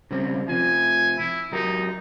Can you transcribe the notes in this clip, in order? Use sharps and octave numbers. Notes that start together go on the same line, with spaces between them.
C#3 G3 C4
C3 F3 G#5
E4
F#3 D#4 G4 A#4